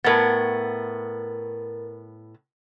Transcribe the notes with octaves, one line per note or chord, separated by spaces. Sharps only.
A2 B3 A#4 A6